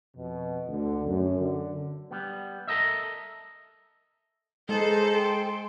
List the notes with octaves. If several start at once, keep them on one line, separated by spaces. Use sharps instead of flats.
F2 B2
D2 D3
F#2
D3
G3 B3
A4 A#4 D#5 E5
G#3 D#4 A4 B4 C5
C5 G5 C6